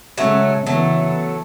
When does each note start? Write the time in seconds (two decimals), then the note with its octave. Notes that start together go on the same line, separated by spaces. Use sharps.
0.18 C#3 F#3 G#3 A3 C#4
0.67 C#3 E3 F#3 A3 B3